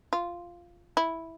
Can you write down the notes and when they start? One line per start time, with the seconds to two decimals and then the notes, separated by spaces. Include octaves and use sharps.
0.13 F4
0.97 E4